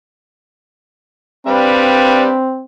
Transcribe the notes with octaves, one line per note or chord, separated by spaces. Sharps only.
G3 C4 D4 B4 F5 B5